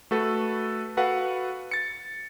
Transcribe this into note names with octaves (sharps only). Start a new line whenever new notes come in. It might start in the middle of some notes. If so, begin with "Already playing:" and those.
A3 F#4 A4 B4
F#4 A4 B4 F5 F#5
A6 C#7